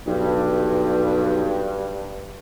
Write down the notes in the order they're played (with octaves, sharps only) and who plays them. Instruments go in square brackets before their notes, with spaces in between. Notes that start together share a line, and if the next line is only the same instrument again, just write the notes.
[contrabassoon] B1 [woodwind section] G2